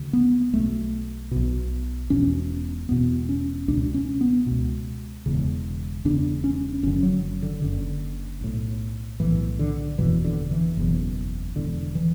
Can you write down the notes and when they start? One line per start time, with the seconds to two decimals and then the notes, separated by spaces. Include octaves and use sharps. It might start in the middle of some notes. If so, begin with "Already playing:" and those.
Already playing: D2 C#3
0.13 B3
0.53 B1 B2 A3
1.31 B1 B2
2.10 E1 E2 B2 C#4
2.89 E1 E2 B2 B3
3.29 C#4
3.68 C#2 B2 D4
3.94 C#4
4.21 B3
4.46 C#2 B2
5.26 E1 E2 C#3
6.05 E1 E2 C#3 D4
6.44 C#4
6.83 F#1 F#2 D3 C#4
7.03 F#3
7.42 D3
7.62 F#1 F#2 D3
8.41 B1 A2
9.20 B1 A2 E3
9.59 D3
9.98 F#1 E2 B2 E3
10.24 D3
10.51 E3
10.77 F#1 E2 B2
11.56 E1 E2 D3
11.95 E3